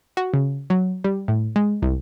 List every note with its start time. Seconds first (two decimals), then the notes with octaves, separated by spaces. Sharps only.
0.17 F#4
0.34 C#3
0.70 F#3
1.04 G3
1.28 A2
1.56 G#3
1.82 C2